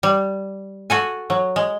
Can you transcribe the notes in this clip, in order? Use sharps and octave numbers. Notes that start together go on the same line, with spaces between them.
G3
F#4 A4 G#5
F#3
G#3